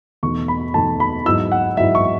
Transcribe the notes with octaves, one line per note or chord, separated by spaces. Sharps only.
E2 B2 A3 D#4 C#6
B5
E2 B2 A3 D#4 A5
B5
G#2 F#3 B3 E4 E6
F#5
G#2 F#3 B3 E4 E5
C#6